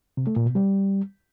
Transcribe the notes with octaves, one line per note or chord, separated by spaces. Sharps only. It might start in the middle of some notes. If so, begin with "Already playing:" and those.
C3
A3
A#2
B2
G3